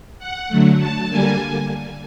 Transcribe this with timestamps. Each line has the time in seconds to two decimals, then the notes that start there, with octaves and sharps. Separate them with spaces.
0.19 F#5
0.48 D3 F#3 A3
0.79 A5
1.09 D3 G3 A#3 G#5